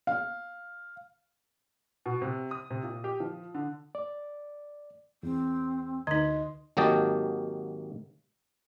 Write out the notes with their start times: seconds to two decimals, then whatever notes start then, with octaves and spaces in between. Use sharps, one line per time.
0.07 F5
2.06 B2
2.22 C3
2.51 D#6
2.70 C3
2.83 A#2
3.04 G4
3.20 F3
3.54 D3
3.95 D5
5.23 E2 C4
6.07 D2 D3 D#4 B4 D#5 C6
6.77 G#1 F#3 A#3 G4 D#5 A5